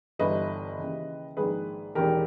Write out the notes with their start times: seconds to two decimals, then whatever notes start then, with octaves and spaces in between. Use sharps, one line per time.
0.19 G1 G2 E3 B4 D#5
0.78 D#2 C#3 E3
1.37 A#1 G#2 D#3 G#4 B4
1.95 E1 E2 D#3 G4 A#4